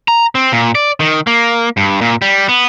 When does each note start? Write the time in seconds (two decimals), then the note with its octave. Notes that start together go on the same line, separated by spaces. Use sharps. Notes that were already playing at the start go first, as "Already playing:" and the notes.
0.08 A#5
0.35 C4
0.52 A#2
0.75 D5
1.00 D#3
1.27 A#3
1.77 G2
2.01 A#2
2.22 G3
2.49 B3